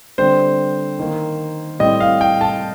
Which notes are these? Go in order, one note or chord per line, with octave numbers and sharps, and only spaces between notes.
D3 G3 C4 C5
D#3 A#3
A2 G3 C4 D#5
F5
G5
A5